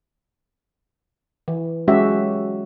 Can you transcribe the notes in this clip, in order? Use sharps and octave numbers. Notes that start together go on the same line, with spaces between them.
E3
F#3 G#3 C#4 F#4 G4 E5